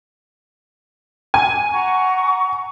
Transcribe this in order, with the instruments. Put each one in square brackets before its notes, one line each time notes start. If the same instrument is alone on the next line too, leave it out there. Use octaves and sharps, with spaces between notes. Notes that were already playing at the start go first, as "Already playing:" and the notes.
[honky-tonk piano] G#5
[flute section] F#5 A#5 C#6